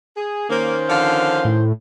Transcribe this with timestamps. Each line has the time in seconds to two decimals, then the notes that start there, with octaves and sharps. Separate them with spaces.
0.17 G#4
0.50 D#3 A#3 C#4 C5
0.89 D3 F3 F5
1.45 A2